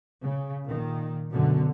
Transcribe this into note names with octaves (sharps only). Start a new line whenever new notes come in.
C#3
A#2 D#3
F#2 B2 D3